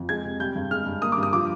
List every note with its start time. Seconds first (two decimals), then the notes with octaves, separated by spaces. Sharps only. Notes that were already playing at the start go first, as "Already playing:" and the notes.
Already playing: F2
0.09 G#3 G#6
0.25 C3
0.40 G3 G6
0.56 G2
0.71 G#3 F6
0.86 G2
1.02 A#3 D#6
1.12 D6
1.18 G2
1.23 D#6
1.33 F3 D6